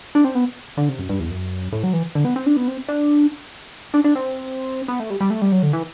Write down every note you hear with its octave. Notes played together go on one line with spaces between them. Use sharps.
D4
C4
B3
D3
C3
F#2
G2
E2
F#2
A2
F#3
E3
D3
B3
C4
D4
B3
C4
D4
D4
D4
C4
B3
A3
G3
G3
A3
G3
F#3
D3
E3